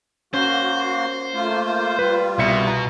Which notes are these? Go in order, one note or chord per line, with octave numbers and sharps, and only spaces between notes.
A#3 C#4 F#4 C5
A3 A#3 F4
G3 F4 B4
C2 B2 E5 C#7
A#5